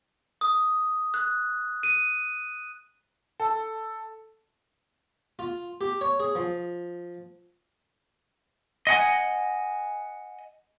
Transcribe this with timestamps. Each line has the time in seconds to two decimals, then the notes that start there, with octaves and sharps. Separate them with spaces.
0.41 D#6
1.14 F#6
1.83 D#7
3.40 A4
5.39 F4
5.81 G4
6.01 C#5
6.20 G#4
6.35 F3
8.87 D#5 F#5 G#5